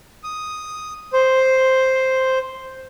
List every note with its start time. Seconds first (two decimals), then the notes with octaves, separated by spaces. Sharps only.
0.24 D#6
1.13 C5